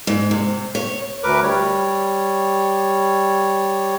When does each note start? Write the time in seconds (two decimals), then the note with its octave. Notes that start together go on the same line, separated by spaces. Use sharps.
0.07 G#2
0.31 C3
0.75 C#5
1.23 D2 A#4 B4 D6
1.43 G3 C#5